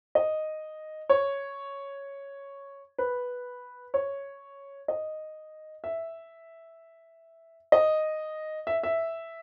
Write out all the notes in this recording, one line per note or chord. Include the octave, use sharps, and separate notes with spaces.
D#5
C#5
B4
C#5
D#5
E5
D#5
E5
E5